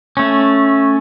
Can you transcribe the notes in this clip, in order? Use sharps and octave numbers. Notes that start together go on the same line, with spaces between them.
A3 C#4